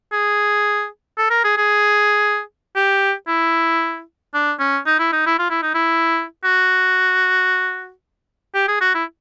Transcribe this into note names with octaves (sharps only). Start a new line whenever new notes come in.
G#4
A4
A#4
G#4
G#4
G4
E4
D4
C#4
D#4
E4
D#4
E4
F4
E4
D#4
E4
F#4
G4
G#4
F#4
E4